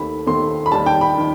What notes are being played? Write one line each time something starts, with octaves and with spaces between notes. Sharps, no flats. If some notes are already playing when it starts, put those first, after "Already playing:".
Already playing: D#2 D#3 A3 C4 B5
D#2 D#3 A3 C4 C6
B5
D#2 D#3 G3 A5
G5
B5
D#3